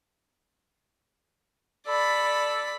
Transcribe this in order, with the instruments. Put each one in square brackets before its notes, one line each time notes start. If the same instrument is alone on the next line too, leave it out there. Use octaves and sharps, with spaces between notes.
[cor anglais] A4 [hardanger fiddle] D5 B5